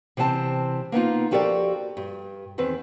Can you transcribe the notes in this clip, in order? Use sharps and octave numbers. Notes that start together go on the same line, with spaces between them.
C3 E3 G3 C4 G#5 A5
A#3 B3 D#4 F4
F3 F#4 G4 A4 A#4 D5
G2
E2 D#3 C4 B4